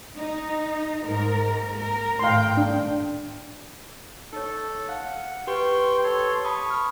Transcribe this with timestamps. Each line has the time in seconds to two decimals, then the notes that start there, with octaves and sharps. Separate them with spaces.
0.15 D#4
1.04 G#2 A#4
1.77 A#4
2.19 G#1 A2 F5 G5 C6
2.57 D4
4.33 D#4 A4 C#5
4.88 F5 F#5
5.47 G4 B4 G5 C6 C#6
6.04 A4 C#5 C6
6.44 A5 B5 C#6 D#6
6.70 F6